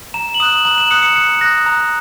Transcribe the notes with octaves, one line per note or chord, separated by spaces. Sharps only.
A#5 E7
F#7
D#6 F#6 E7
A#5 F#7
E7
D#6 F#6 C#7
C#7
A#5 C#7
D#6 F#6 A#6
A#5